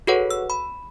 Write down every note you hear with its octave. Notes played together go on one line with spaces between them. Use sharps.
F#4 G#4 A4 B4 C#5 F#5
E6
B5